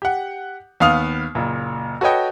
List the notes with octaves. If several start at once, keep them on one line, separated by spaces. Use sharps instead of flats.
G4 F#5
D#2 B3 F5 D#6 F6 F7
F#1 A#2
F#4 A4 B4 C#5 D#5 G5